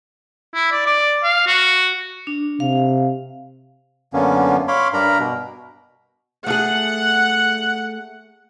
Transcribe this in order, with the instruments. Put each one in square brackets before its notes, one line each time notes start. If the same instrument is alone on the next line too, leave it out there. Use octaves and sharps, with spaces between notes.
[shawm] E4
D5
D5
F5
F#4
[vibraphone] D4
[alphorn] C3 [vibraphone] F5
[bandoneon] F#2 D3 A#3 B3 C#4
C#5 F5 B5 C6 D6
G2 D4 A#4 A#5 B5
B2
[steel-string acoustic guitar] A3 G#4 [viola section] F#5